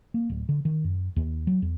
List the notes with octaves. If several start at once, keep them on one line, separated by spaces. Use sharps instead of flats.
A#3
D1
D3
D#3
F#2
D#2
F#3
E2